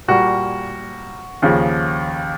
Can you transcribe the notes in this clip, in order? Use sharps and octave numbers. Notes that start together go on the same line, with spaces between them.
A#2 G3 A#3 F#4
D#2 C#3 F3